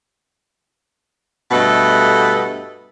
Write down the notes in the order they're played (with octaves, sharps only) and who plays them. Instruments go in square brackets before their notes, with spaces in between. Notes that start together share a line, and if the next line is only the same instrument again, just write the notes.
[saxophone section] G2 B2 A3 A4 B4 D#5